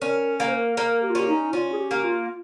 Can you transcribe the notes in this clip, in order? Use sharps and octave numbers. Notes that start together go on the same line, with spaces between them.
C#4 A#4
A#3 A#4
C5
A#4
A#3 A#4
G4
F4
C#4 G4
D#4
C#4 F4
G#4
G4
A#3 G4
F4